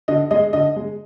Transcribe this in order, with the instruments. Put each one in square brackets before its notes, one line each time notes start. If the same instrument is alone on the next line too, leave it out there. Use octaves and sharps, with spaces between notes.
[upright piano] D3 D#5
G#3 D#5
D3 D#5
G#3